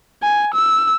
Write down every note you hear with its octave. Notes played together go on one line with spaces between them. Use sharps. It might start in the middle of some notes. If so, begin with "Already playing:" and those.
G#5
E6